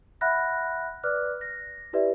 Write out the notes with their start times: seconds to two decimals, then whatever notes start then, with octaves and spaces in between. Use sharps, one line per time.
0.21 E5 F#5 B5 F6 F#6 A#6
1.03 B4 D5 D6 F6 F#6
1.41 A#6
1.93 E4 G4 B4 D5 E5